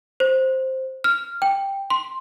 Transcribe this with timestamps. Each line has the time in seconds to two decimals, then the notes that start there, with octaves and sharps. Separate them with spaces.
0.20 C5
1.04 F6
1.42 G5
1.90 C6